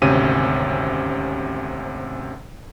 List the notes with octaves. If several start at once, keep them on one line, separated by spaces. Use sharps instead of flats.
G#1 D2 C3 C#4 D#7